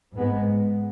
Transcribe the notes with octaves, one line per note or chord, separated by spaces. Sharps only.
G#2 G#3 B3